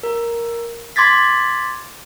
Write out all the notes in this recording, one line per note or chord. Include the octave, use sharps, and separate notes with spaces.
A#4
C6 D6 G#6 A6 B6